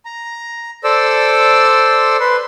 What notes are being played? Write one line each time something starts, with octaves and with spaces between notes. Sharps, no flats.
A#5
A4 C5 D5 E6
B4 C6